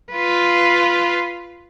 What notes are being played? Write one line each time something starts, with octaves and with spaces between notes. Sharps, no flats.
F4 B4